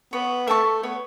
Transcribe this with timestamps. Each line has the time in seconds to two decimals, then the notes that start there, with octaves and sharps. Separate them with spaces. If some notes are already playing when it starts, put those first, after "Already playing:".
0.13 B3 C#5
0.47 A3 E5 A5 C#6
0.83 B3 C#5